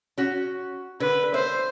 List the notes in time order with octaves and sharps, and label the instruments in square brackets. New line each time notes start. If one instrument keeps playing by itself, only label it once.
[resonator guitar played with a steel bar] C#4 F#4
[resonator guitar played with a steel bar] D3 [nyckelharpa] B4
[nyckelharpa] C5 [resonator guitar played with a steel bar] E5